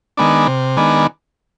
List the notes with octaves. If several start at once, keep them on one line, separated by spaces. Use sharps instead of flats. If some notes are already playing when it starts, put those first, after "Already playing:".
D#3 G#3 B3 D4
C3
D#3 G#3 B3 D4